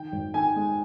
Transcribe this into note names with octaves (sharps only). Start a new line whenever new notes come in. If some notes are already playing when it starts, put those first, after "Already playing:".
Already playing: D#3 G5
G#1
D#3 G#5
G#3